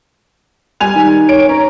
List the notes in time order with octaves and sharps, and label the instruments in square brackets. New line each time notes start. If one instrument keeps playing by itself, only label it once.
[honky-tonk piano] G3 G#5 F7
[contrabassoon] D#3
[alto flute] C#5 [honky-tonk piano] D7
[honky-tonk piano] C#4 [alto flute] A#5